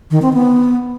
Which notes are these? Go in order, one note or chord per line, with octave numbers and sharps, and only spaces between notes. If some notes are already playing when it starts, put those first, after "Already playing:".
D#3
C4
B3